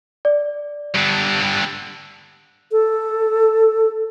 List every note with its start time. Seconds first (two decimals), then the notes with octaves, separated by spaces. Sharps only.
0.25 D5
0.95 G2 D3
2.72 A4